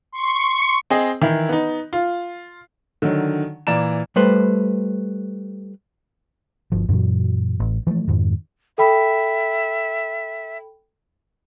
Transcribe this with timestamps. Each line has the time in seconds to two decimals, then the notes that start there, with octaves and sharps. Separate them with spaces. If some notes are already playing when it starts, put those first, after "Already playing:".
0.12 C6 C#6
0.90 C4 G#4 D#5
1.22 D#3 E3 E4
1.49 B3 D#4
1.93 F4
3.02 D3 D#3 F#3
3.67 A#2 E3 D5 A#5 E7
4.16 G3 A3 B4 C5
6.72 G1 F3
6.89 F#2 A#2 E3 F#3
7.60 A1
7.87 E3 F3 G#3 A3
8.08 F2 G#2 D#3
8.78 A4 E5 G5 B5